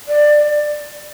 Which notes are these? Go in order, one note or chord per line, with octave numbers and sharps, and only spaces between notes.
D5